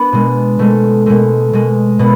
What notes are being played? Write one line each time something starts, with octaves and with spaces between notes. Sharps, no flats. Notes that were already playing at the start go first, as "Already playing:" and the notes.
Already playing: B3 D4
B2 G#3
B2 G#3 A3
B2 G#3 A3
B2 G#3
B2 B3